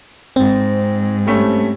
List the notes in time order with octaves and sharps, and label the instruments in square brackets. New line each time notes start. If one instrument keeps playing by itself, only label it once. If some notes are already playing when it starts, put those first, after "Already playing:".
[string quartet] G#2 [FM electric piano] C4
[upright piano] G3 A3 C#4